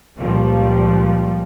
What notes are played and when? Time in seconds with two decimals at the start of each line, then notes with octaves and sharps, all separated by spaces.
0.18 C#2 A#2 F3 G3